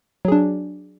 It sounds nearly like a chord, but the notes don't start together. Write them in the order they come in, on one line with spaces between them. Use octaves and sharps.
F#3 G#4 D4